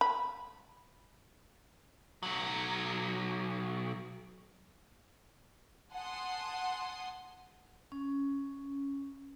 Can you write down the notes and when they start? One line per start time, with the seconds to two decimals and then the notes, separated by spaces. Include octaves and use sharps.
0.01 B5
2.23 B1 F#3
5.90 F#5 G#5 A5 C6 D#6
7.92 C#4